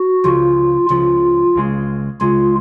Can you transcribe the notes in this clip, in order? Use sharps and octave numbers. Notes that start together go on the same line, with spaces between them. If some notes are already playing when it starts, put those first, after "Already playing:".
Already playing: F#4
C#2 C#3 F3 F4
C#2 C#3 F3 F4
C#2 C#3 G#3
C#2 C#3 G#3 F4